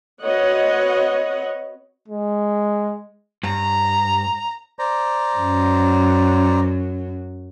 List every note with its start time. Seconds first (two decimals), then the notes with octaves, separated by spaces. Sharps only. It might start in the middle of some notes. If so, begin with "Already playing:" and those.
0.23 C4 F#4 B4 C#5 D#5 F#5
2.08 G#3
3.43 G2 A#5
4.79 C5 D5 A#5
5.37 F#2 F#3